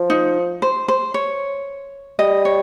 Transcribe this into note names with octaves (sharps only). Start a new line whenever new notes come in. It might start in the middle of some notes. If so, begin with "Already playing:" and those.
Already playing: F3
D#4
C5
C5
C#5
G3 D#5
C#5